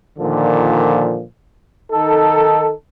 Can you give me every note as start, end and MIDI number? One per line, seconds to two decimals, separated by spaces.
0.18 1.23 46
0.18 1.23 50
0.18 1.23 51
0.18 1.23 53
1.92 2.72 51
1.92 2.72 63
1.92 2.72 69